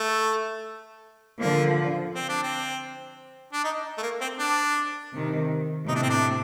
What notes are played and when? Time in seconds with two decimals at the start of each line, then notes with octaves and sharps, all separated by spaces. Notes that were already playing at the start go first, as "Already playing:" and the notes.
Already playing: A3
1.40 D3 F3 A#3
2.15 C4
2.29 D4
2.43 C4
3.53 D4
3.64 D#4
3.98 A3
4.02 A#3
4.21 C4
4.39 D4
5.13 C3 D#3
5.88 A2 C3 D#4
5.96 D4
6.02 C4
6.10 D4